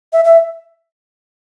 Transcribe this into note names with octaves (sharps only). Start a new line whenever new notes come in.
E5
E5